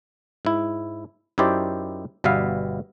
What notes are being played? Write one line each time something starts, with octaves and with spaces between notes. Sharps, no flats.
G#2 E4
F#2 D#4 E4 G4 C5 D5
G1 B2 G3 B3 E5 F5